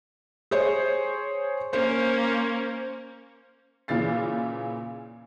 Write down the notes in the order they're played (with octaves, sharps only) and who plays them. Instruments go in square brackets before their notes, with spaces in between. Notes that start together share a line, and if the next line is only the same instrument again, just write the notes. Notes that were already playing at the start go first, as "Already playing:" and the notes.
[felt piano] G#4 C5 C#5
[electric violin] A#3 C#4 [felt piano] C5
[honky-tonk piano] A#2 C#3 E3 A6 C7